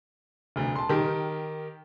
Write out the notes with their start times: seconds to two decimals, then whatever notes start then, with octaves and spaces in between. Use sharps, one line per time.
0.56 F1 D2
0.76 A5 C6
0.89 D#3 G4 A#4